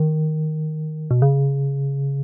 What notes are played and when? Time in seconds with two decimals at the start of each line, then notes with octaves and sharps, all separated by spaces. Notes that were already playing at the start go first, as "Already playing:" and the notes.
Already playing: D#3
1.11 B2
1.22 C#3